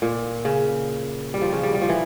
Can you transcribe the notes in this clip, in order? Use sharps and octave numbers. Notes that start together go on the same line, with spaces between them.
A#2
C#3
G3
F3
C#3
G3
G3
F3
E3